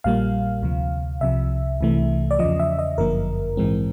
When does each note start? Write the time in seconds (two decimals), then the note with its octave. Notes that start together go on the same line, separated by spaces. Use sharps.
0.04 A#1 A#2 G3 A#3 F5
0.63 D2 C3 F3
1.21 C2 C3 F3 E5
1.81 C2 C3 E3 A3
2.31 D5
2.39 E2 C#3 F3 D#5
2.60 E5
2.79 D#5
2.98 G1 F#2 D3 F3 A#3 A#4
3.57 A#1 G#2 E3 G#3 C4